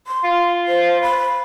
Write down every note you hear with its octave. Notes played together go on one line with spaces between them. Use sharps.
C6
F4
C5
B5